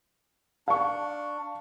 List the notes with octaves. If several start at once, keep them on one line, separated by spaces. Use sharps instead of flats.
D4 F5 C#6